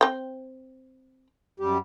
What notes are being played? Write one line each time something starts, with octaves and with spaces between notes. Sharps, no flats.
C4 G5
F#2 G3 G4